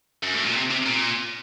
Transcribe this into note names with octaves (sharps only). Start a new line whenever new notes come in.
F#2
A2
A#2
C3
C3
A#2